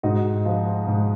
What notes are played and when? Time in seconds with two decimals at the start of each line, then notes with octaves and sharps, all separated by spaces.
0.03 G#2 D#4 F#4
0.45 F3
0.87 G#2